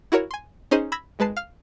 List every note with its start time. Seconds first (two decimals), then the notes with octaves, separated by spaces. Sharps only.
0.12 E4 F#4 A#4 C#5
0.31 G#5 C6
0.71 C#4 D#4 G#4 C5 D#5
0.92 B5 E6 G#6 A#6 B6
1.19 G#1 G#3 B4 A5 C7
1.37 F5 F6